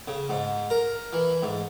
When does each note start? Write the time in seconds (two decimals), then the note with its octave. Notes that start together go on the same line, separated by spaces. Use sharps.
0.08 C#3
0.29 G#2
0.70 A#4
1.13 E3
1.42 G#2